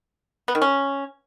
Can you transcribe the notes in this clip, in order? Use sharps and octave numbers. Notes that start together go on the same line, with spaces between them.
B3
D#3
C#4